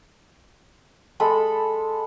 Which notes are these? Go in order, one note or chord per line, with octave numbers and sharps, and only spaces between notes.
G#3 A4 B5